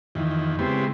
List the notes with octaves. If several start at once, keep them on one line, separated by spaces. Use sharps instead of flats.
F2 D#3 E3
C#3 G#3 B3 C4 E4 G4